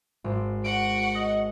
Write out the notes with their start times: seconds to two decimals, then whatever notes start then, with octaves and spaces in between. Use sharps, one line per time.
0.24 G#1
0.64 F#4 F#5 D7
1.15 D#5